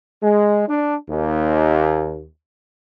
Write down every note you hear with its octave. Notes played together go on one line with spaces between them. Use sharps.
G#3
D4
D#2